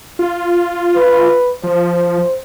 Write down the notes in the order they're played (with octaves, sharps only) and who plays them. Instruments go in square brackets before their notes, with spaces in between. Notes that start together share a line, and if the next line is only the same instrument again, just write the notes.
[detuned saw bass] F4
[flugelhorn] B4
[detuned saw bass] F3 [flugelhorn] C5